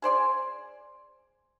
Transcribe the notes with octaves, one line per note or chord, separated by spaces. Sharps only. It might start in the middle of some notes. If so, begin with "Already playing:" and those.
G#4 C5 D5 G#5